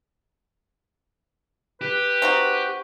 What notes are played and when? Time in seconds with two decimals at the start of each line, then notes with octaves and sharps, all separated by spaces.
1.81 G4 B4
2.22 C4 D#4 F#4